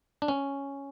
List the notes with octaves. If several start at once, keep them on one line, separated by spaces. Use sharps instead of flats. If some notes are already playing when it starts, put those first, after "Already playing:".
D4
C#4